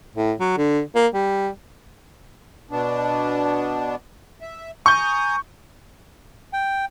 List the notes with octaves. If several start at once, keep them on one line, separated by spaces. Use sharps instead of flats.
A2
F#3
D3
A#3
G3
B2 B3 D4
E5
G#5 A#5 C#6 D#6 G6
G5